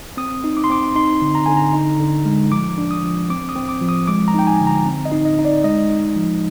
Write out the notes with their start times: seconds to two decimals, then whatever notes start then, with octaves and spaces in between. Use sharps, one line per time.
0.17 C4 D#6
0.44 D#4
0.57 D6
0.64 C6
0.70 C4 D6
0.96 D#4 C6
1.22 D3
1.35 A#5
1.46 D3 G#5
1.57 A#5
1.74 D#4
2.00 D3
2.25 G#3
2.52 F3 D6
2.78 D4
2.91 D#6
3.04 F3
3.30 C4 D6
3.49 D#6
3.56 C4
3.69 D6
3.81 F3
3.89 D#6
4.08 G#3 D6
4.28 A#5
4.34 D#4 G5
4.47 G#5
4.61 D3
4.67 A#5
4.86 C4
5.05 D#5
5.12 D#4
5.25 D#5
5.39 D#4
5.45 D5
5.64 G#3 D#5
5.90 D#4
6.16 F3